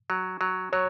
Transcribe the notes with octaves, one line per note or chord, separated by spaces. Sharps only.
F#3
F#3
F#3 C#5